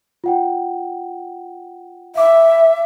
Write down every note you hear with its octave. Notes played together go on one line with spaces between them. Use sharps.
F4 F#5 G5
E5 F5 D6